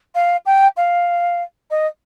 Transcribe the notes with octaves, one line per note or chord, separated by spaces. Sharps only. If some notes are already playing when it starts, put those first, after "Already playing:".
F5
G5
F5
D#5